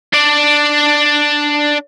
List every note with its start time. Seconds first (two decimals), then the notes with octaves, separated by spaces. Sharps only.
0.14 D4 D5